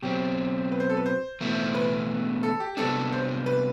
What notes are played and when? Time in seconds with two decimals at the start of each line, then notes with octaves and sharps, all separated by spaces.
0.02 B2 F#3 C4 G4
0.72 B4
0.80 C5
0.90 A4
0.97 B4
1.06 C5
1.41 E2 B2 A3 E4
1.75 B4
2.43 A4
2.60 G4
2.77 C3 G3 B3 D4 A4
3.12 C5
3.46 B4